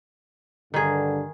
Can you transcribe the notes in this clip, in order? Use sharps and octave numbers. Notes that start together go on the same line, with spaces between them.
G2 D3 D#3 G#4